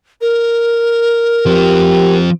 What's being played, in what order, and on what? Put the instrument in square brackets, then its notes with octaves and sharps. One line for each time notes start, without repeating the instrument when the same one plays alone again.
[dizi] A#4
[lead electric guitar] F3 C4 [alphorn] G4